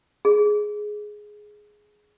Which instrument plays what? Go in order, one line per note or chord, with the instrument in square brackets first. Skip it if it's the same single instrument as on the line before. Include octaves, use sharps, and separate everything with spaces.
[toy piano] G#4